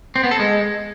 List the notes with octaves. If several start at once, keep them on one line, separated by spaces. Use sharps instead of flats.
C4
B3
A4
G#3